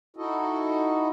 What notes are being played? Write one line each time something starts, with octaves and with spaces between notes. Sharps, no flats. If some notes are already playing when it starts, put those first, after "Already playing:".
D#4 E4 F#4 A4 D#5